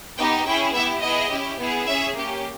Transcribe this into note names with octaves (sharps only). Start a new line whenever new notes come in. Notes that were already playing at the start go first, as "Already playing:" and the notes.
B3 D#4 G4 G5
C#4 E4 G#4 G5
B3 E4 G4 E5
B3 E4 G#4 D#5
C#4 E4 G4
B3 E4 G#4
C#4 G#4 E5
A#3 C#4 G4